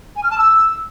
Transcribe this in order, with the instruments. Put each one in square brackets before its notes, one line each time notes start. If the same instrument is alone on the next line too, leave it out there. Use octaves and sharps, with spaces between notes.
[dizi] G#5
F6
A5
E6